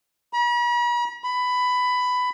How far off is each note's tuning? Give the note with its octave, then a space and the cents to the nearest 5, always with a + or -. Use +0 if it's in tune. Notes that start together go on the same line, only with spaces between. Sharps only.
B5 -45
B5 +15